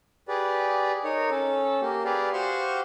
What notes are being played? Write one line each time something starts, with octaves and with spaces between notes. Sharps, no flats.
G4 G#4 B4 D5
D#4 A#4 C#5
C#4 A4
A#3 G4
G4 G#4 B4 D5 F5
F#4 G4 C5 F5 C6 C#6